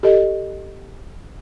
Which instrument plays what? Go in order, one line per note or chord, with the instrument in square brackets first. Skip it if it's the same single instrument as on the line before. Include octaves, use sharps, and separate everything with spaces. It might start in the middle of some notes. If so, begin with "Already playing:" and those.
[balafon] G4 A4 D#5